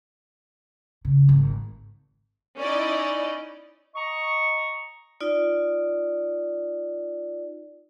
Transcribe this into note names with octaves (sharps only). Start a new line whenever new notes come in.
C#3
G#1
C#4 D#4 E4 D5 D#5
D#5 A#5 C#6
D#4 F4 D5